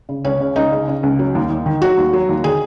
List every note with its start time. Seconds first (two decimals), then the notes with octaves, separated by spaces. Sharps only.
0.09 C#3
0.25 C#2 C#4
0.40 C#3
0.56 C#2 D#4
0.72 C#3
0.88 C#3
1.03 C#2
1.19 F#3
1.35 D#2
1.50 D#2
1.66 D#3
1.81 F#3 F#4
1.97 D#2
2.13 F#3
2.29 D#2
2.44 D#3 G#4